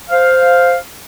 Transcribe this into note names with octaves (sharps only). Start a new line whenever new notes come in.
C5 F5